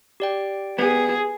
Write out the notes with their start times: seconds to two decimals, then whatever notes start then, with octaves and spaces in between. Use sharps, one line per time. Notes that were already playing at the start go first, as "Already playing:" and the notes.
0.20 G4 D5 G5
0.79 B3 G#4